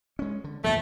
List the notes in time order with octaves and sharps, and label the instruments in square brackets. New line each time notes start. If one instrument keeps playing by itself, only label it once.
[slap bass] G#3 C#4
D3
[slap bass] E2 A#2 F3 [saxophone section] A3